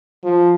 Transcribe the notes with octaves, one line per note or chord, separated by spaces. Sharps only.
F3